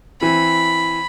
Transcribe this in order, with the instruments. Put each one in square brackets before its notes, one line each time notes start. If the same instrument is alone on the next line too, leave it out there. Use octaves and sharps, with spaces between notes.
[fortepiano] E3 C4 [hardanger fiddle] B5